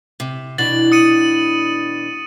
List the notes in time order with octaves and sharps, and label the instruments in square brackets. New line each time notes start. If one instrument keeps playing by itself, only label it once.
[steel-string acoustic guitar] C3
[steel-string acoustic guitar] B2 E3 D4 [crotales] A6 F#7
[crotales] D#6 C#7 D#7